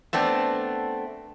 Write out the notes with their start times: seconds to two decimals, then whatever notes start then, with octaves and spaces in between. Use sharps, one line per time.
0.13 A3 B3 C4 D4